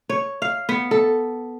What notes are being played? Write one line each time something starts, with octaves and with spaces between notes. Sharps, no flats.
C#5
F5
B3
A4